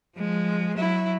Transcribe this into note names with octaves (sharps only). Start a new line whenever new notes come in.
F3 G#3
F#3 E4